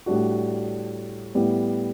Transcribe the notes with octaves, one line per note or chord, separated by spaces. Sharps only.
A2 G3 D4 F#4
A2 G3 B3 E4